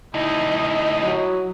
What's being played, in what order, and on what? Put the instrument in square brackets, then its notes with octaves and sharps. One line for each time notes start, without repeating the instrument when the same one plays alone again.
[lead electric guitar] D2 D#4 [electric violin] E4 D#6
[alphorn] F#3